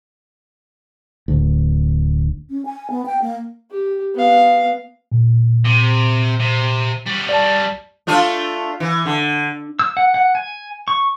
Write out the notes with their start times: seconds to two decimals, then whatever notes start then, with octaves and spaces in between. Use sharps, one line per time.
1.28 D1 D2
2.50 C#4
2.66 G#5
2.90 B3
3.06 G5
3.22 A#3
3.71 G4
4.14 B3 F5
5.12 A#2
5.65 C3
6.40 C3
7.06 G3 F#4
7.29 D5 A5
8.07 A3 D4 F4
8.80 E3
9.05 D3
9.79 E6
9.97 F#5
10.14 F#5
10.35 G#5
10.88 C#6